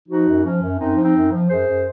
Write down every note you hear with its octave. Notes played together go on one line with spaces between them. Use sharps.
F3 D#4 F#4
F#2
F3 C#4
F#2
F#2 C4 D#4
F3
C4 D#4
F#2
F3
F#2 G#4 C5
F#2